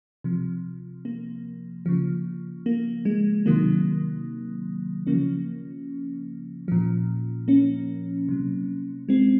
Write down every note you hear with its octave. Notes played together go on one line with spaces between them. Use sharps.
C3 F3
A#3
C#3 F3
A#3
G#3
C3 D#3 F#3 A#3
C#3 F3 A#3 C#4
A#2 F3
A#3 C#4
C3 F#3
G#3 C4